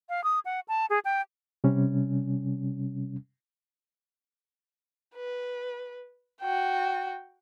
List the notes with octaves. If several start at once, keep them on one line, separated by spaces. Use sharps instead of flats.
F5
D#6
F#5
A5
G#4
G5
C3 G3 C#4
B4
F#4 G5